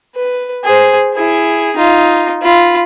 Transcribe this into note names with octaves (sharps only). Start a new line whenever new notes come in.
B4
G#4 C5
E4 G#4
D#4 F4
F4 B5